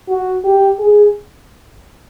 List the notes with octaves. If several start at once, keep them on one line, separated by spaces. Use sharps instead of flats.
F#4
G4
G#4